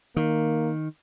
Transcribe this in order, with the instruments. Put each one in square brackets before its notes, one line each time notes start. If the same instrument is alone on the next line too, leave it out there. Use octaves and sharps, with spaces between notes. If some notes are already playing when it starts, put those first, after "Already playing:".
[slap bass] D#3 [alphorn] A#3